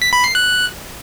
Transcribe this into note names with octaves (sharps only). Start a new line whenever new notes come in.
B6
B5
C7
F#6